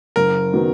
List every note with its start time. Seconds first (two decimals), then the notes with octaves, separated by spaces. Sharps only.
0.16 F#1 A#4
0.53 D#3 F#3 B3